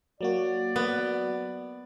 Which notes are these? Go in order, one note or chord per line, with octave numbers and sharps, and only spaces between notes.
F#3 A#3 F#4 D5
B3